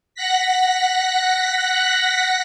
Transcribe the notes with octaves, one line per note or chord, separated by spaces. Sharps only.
F#5 F#6 A#6 B6